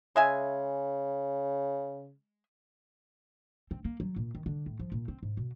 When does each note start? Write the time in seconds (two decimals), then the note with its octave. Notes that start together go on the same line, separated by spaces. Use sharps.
0.16 C#3 G#3 E5 G#5
3.71 C4
3.85 A#3
4.00 F#3
4.16 A#2
4.35 D#3
4.46 D3
4.66 A2
4.79 F3
4.92 A#2
5.08 C4
5.23 G#2
5.37 B2